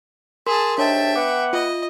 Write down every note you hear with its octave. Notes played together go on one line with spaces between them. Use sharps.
G#4 A#4 A5 C6
D#2 G#2 D4 C#5 E5 G5 A5
B3 F#5 D6
F4 D#5